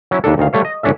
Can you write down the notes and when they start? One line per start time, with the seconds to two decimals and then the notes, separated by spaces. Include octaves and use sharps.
0.11 F#3 C#4 E4
0.24 D#2 D#3 D4 A4
0.38 D2 D#3 F5
0.53 G3 A3 C#5 F5
0.65 D#5
0.83 G1 C#4 D4 A4 E5